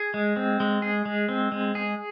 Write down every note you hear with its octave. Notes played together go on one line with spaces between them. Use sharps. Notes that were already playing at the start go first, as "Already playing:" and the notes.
Already playing: G#4
G#3
C4
G#3
G#4
G#3
C4
G#3
G#4